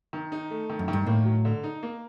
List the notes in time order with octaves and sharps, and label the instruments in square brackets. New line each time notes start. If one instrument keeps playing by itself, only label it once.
[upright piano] D#3
D#4
A3
D#3
[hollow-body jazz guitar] F#2
[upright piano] D#3
[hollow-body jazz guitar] G2
[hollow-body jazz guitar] A2 [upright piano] A#3
[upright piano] F#3
D3
D#4
A#3